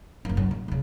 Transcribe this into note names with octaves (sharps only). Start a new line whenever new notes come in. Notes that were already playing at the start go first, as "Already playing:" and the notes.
F#1 A#3
F#2
A#2
C2 C#3